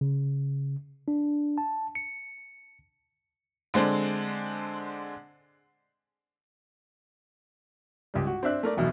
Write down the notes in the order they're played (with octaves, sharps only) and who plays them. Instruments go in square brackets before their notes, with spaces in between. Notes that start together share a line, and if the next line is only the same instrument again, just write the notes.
[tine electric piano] C#3
D4
A5
C#7
[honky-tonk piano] D3 G#3 C4 D4
[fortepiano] C#2 G3
F#4
C4 D4 E5 F#6
A3 A#4 D5
B1 E2 B2